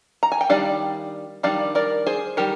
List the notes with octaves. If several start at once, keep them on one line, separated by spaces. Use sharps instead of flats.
A#5
G#5
G5
D#3 G3 D4 D5 F5
D#3 G3 D4 D5 F5
A#4 D5
G#4 C5
D#3 G3 G4 A#4